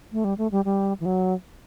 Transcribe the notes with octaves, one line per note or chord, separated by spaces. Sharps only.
A3
G3
A3
G3
G3
E3
F#3